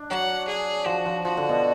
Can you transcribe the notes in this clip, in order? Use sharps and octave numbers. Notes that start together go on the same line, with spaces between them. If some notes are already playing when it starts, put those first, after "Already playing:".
Already playing: D4
F#3 F#5
G#4
F3 F#4
F3
F3 F#4
D3
B2